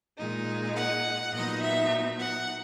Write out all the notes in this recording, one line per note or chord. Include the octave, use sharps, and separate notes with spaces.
A#2 G#3 D#4
F#5
A#2 F#3 B3 D#4 D#5
E5
F#5